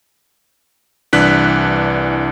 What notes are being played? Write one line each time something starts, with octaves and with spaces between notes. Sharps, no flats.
C2 E3 D4 F#6 B6